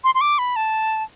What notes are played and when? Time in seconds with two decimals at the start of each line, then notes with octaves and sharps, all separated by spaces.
0.04 C6
0.15 C6
0.21 D6
0.39 B5
0.56 A5